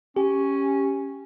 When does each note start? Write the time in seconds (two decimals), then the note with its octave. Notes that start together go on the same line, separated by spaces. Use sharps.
0.16 C#4 G4